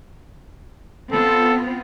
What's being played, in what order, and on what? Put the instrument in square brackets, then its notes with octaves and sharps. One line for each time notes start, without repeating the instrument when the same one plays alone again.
[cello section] B3 C4 F4 [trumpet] A4